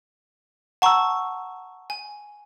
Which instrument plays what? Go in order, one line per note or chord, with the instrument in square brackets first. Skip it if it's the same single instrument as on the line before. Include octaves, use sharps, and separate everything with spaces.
[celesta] F#5 A#5 E6 [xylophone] A5 C#6
[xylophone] G#5